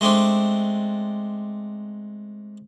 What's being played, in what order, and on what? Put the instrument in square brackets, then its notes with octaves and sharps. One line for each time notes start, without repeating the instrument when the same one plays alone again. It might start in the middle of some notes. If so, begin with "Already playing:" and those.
[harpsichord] G#3 A3 C4 D4